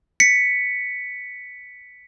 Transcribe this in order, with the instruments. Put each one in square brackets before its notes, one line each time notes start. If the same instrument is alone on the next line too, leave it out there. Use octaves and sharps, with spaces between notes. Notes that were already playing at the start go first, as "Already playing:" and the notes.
[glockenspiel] B6 C#7